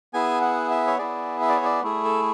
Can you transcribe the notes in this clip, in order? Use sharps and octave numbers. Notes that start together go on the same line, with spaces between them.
B3 E4 G#4 G#5
F#5
E5
C#5
B3 E4 G#4 D5
E5
D5
C#5
D5
A3 E4 G#4
A4